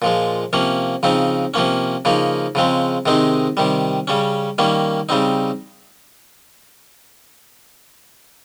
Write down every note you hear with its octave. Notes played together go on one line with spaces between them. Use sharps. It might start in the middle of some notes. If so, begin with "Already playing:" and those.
A#2 F3 G#3
C3 F3 A#3 C#4
C#3 F3 C4 D#4
C3 F3 A#3 C#4
C#3 F3 A#3 D#4
C#3 F3 G#3 C4
C3 D#3 G#3 C4 D#4
C3 D#3 G3
C#3 G3 C#4
D#3 G3 A#3 C#4
C#3 G3 C4 D#4